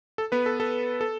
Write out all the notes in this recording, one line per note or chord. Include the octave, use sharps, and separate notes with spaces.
A4
B3 B4
A4
A4
A4